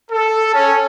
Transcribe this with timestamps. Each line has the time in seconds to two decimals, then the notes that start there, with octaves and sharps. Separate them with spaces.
0.11 A4
0.54 C#4